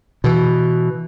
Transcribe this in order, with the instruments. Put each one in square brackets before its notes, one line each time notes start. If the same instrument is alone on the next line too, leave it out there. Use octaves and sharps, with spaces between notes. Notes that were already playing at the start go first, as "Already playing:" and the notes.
[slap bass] B2 E3